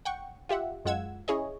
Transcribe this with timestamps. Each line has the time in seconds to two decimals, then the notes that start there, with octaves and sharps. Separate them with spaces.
0.05 F#5 G5 C#6
0.49 F4 G4 E5 F#5
0.85 F#2 G#3 F4 F#5 E6 G#6
1.28 C#4 E4 G#4 C#5 D#5